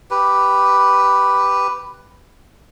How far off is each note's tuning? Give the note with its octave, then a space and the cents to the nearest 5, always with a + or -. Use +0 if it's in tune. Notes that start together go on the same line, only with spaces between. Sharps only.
G4 +0 B4 +0